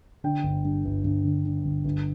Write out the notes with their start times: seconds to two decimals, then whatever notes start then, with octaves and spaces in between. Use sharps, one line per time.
0.24 D3 G5
0.43 G1
0.65 G2
0.85 G1
1.04 G1
1.25 D3
1.45 D3
1.65 G1
1.85 G1